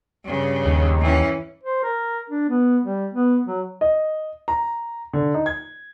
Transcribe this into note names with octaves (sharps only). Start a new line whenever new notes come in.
G2 C#3
D#2
E3 C#4
C5
A#4
D4
B3
G3
B3
F#3
D#5
A#5
D3
D#4
G#6